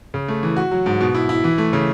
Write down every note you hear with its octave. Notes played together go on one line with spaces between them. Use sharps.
C#3
A3
E3
F#4
F#3
G#2
B2
E4
E4
E3
A3
C#3